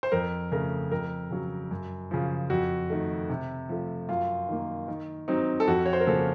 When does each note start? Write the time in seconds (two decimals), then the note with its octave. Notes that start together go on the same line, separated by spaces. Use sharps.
0.03 C5
0.12 F2 A#4
0.52 C#3 A3 A#4
0.91 F2 A#4
1.31 C#3 F#3
1.71 F#2
2.11 C#3 F3
2.50 F2 F#4
2.90 D#3 A3
3.29 C3
3.69 F3 A3
4.09 F#2 F4
4.49 D#3 A#3
4.88 D#3
5.28 F#3 C4 D#4
5.60 A4
5.67 F2 F#4
5.86 C#5
5.93 C5
6.00 A#4
6.07 C#3 F3 A#3 C#4 A4